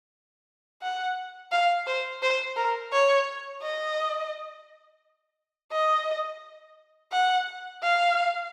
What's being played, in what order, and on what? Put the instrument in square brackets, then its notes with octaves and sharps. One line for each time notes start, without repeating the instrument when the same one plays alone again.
[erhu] F#5
F5
C5
C5
A#4
C#5
D#5
D#5
F#5
F5